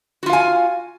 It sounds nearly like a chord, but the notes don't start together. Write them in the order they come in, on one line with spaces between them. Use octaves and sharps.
F#4 F4 F5 G#5